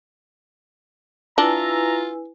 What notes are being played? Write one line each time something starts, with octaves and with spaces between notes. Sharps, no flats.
D4 E4 F4 B4 E5 G#5 A#5